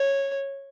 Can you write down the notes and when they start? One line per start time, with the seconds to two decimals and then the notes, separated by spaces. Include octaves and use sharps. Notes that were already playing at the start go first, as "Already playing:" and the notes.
Already playing: C#5